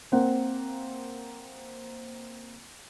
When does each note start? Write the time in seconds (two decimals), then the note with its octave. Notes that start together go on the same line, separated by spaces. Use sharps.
0.12 A#3 C4 F#5